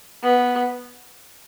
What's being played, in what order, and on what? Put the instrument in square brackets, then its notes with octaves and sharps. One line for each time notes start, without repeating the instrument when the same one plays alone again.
[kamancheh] B3